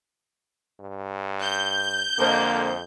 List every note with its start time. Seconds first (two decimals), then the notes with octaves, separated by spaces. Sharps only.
0.80 G2
1.43 G6
2.19 F2 D3 A#3 A4 C5 D#5